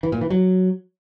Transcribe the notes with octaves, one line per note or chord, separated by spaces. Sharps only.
E3
A#2
E3
F#3